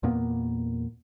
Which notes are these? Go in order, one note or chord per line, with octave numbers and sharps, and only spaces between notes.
E2 A#2 A#3 B3